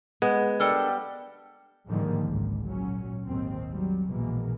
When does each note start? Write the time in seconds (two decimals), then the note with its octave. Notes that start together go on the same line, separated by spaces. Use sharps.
0.22 G#3 B3
0.60 G3 D4 A4 A#4
1.87 G#2 D3 D#3 F3 G3 A#3
2.26 G#1 C#2 G#2
2.64 A#2 F#3 C#4
3.26 G#1 D#2 D#3 C4
3.70 F#3 G3
4.08 A#1 B2 E3 G#3 A#3